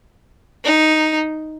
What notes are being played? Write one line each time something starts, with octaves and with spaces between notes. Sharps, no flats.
D#4